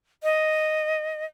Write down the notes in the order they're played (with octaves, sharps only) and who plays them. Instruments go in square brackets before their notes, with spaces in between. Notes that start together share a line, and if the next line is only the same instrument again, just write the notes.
[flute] D#5